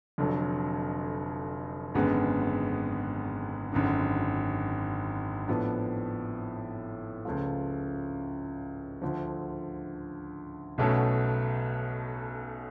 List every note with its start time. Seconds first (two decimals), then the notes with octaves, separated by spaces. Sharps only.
0.18 F1 F2 D3 F#3
1.95 G#1 F#2 D3 G#3 B3
3.72 G#1 F#2 D3
5.48 A2 F3 B3 D4
7.25 C#2 C#3 F3 A3 F4
9.02 D2 D3 F3
10.78 B1 B2 A3 C#4